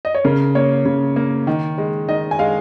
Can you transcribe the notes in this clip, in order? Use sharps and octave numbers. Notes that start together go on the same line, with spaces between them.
D#5
C#5
C#3 A#4
A#3 C#5
C#3
A#3
D#3
G#3
D#3 D#5
G#5
G#3 F5